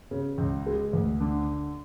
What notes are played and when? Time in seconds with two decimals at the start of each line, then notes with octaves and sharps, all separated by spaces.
0.11 C#3
0.38 C#2
0.66 G#3
0.93 D2
1.20 D3